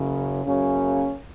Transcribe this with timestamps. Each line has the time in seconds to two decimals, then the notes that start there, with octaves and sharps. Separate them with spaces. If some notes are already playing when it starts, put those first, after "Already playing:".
Already playing: F#1 F#2 C#3
0.45 F#2 C#3 A#3 C#4